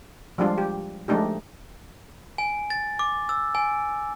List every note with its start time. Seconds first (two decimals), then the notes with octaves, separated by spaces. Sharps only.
0.38 F3 G3 G#3 D4 F4
0.58 G4
1.08 F3 G#3 A3 D4 D#4 G4
2.38 G#5
2.70 A6
2.99 D6
3.29 E6
3.55 G#5